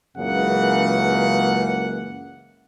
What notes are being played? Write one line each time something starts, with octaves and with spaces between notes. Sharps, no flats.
C#2 F#2 C#3 E3 A#3 F#5